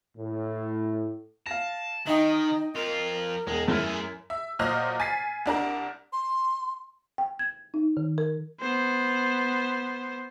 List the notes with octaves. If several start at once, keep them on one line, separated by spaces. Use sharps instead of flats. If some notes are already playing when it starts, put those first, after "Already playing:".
A2
F5 A5 A#6
D#3 D#4 D#5 G5
F2 F4 A#4
E1 G#3
F#2 A3 E4 G#4 F6
E5
A#2 F#3 C5 D#5 F6
G#5 A6 B6 C7
C2 D4 A#4
C6
G5
G#6
D#4
D#3
A#4
B3 C5